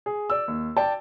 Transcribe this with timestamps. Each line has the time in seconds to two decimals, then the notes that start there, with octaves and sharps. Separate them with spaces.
0.06 G#4
0.30 D5 E6
0.48 D#2
0.77 D5 G5 A5